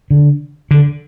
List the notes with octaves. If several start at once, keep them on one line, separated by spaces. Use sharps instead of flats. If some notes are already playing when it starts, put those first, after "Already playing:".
D3
D3